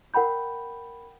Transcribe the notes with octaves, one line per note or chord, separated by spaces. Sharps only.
A#4 F#5 G5 B5 G6